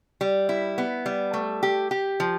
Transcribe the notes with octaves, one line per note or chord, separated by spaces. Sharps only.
G3
E4
B3
G3
A3
G4
G4
F3